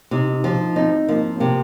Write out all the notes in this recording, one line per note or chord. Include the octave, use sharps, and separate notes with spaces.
C3 D#4
D#4
F3 F4
D#4
C4 D#4
F3 A#3
C4
C3 A#3